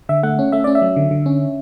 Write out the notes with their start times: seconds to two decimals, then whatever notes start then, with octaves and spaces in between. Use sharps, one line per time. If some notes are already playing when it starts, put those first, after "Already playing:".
0.09 D3 E5
0.23 A3 F#5
0.39 C#4
0.52 A3 E5
0.64 C#4 D5
0.75 E5
0.82 F#3
0.96 D3
1.11 D3
1.26 C#4